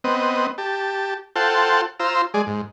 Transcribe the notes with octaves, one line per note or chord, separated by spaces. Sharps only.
B3 C4 D#5
G4 A5
F4 A4 C5 F#5 G5 A5
F4 C5 A#5 E6
G#3 G#4 D5
G#2